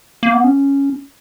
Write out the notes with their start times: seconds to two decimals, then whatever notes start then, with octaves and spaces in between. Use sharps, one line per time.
0.23 A#3
0.34 B3
0.44 C#4